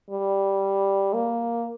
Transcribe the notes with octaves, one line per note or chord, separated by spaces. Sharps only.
G3
A#3